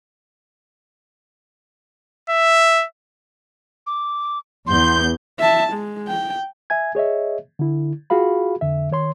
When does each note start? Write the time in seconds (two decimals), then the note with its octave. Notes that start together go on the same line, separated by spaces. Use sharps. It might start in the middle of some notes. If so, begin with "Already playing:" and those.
2.29 E5
3.87 D6
4.67 E2 C6 G6
5.39 E5 A5
5.73 G#3
6.08 G5
6.70 E5 G#5 G#6
6.95 G#4 C#5 D#5 E5
7.59 D3 E4
8.10 F4 F#4 G#4 F5 B5
8.61 F2 D3 E5
8.91 D#3 C#5 C6